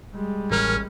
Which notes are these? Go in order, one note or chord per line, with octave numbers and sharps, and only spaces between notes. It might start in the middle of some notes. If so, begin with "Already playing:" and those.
G3 G#3
A1 C#4 A#4 F6